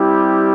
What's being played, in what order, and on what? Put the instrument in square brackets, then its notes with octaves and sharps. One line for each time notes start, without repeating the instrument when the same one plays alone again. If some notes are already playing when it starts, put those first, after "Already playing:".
Already playing: [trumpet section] G3 C4 E4 G4